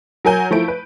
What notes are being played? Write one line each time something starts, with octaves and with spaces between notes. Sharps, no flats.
F#3 A#4 G#5 G6
F3 A3 E4 D7
B4